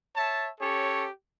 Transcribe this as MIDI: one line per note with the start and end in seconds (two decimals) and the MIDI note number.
0.16 0.48 73
0.16 0.48 76
0.16 0.48 81
0.60 1.07 61
0.60 1.07 67
0.60 1.07 69
0.60 1.07 73